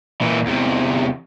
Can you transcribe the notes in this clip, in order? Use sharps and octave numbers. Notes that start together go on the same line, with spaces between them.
A#2 E3
E2 C3